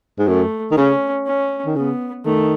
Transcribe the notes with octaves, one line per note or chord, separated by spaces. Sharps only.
G#2
F#2 A3
D#3
C#3 C#4
C#4
D#3
C#3 B3
D#3 A3